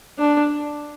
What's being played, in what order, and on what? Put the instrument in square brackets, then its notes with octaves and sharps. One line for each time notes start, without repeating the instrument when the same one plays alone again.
[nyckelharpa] D4